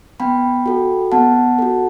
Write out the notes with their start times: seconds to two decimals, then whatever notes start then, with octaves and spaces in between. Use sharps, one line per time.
0.20 B3 G5 B5
0.66 F#4 A4
1.12 B3 F#5 A5
1.59 F#4 A4